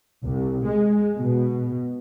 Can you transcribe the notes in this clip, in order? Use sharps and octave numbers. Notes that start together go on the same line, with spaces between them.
C2
G#3
B2